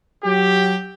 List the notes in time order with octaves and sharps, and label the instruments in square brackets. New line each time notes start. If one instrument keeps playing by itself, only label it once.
[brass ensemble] F#3 G4